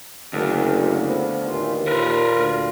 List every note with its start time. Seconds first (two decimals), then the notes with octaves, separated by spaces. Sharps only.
0.33 F#1 D2
1.00 F3 B3
1.47 D#2 A2 E3 F4
1.87 A#2 F4 A#4 B4
2.37 D2